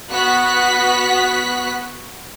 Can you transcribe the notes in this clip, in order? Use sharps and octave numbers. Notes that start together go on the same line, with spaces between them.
B3 F#4 F#6 B6